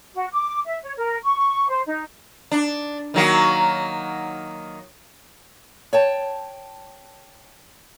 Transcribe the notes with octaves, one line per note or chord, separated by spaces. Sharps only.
F#4
D6
E5
C#5
A#4
C#6
C5
D#4
D4
D#3 F#3 A#3
C#5 G5 A5